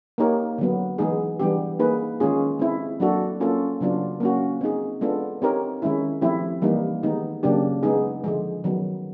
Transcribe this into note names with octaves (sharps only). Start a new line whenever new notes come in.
A#3 D#4 G4 A#4 C#5
D3 F#3 B3
E3 G#3 B3 D#4 G#4
E3 G3 B3 D4 G4
A#3 D#4 G#4 B4
D#3 G#3 C#4 F4 G#4
G#3 C4 E4
F#3 A#3 D4 F#4 A4
A#3 C#4 F4 A4
C#3 F#3 B3 D4 F4
A#3 C#4 F#4
C4 D#4 G#4
G#3 B3 D4 F4 A4
C4 D#4 G4 A#4 C#5
D#3 G#3 C#4 E4
F3 A3 C4 E4 G4
E3 G3 A#3 D#4
D#3 G#3 B3 D#4 G4
C#3 F#3 A#3 D4 G4
G#3 B3 D#4 G#4
D3 F3 G#3
D#3 F#3 B3